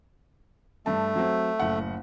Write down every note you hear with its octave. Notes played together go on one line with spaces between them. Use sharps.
G2 A3 A5
F#3 C4
F#1 A2 F#5